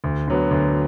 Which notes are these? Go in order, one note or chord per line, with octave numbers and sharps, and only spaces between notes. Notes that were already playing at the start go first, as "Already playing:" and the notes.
D2
D3 F#3 B3
D2